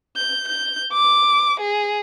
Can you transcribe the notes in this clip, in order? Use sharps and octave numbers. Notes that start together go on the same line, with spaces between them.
G6
G6
D6
G#4